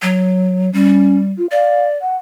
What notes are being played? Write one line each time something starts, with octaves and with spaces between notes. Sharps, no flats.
F#3
G3 C#4
F4
D5 F5
F#5